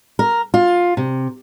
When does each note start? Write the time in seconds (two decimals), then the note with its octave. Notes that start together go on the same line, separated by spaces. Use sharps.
0.19 A#4
0.54 F4
0.97 C3